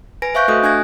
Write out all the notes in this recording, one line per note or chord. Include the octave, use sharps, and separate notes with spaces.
B4 G#5 A#6 D7
C5 E5 F5 C#6 F#6 G6
A3 F#4 A4 D#5 D#6
D4 G#5 F#6 G#6 A#6